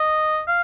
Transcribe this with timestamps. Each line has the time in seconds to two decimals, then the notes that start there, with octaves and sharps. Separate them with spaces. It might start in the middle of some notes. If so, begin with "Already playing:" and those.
Already playing: D#5
0.48 F5